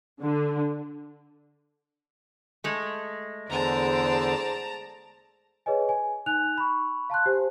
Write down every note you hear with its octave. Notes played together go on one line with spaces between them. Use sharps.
D3
G#3 A3
E2 D3 G#4 C5 D5 A5 A#5
G#4 B4 C#5 D#5 G#5
G#5
D#4 G#5 F#6 F7
B5 C#6
F5 A5 C6 F#6
G4 C5 G#5